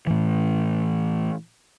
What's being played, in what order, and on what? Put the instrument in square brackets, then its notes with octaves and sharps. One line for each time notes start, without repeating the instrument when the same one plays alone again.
[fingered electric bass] A2 E3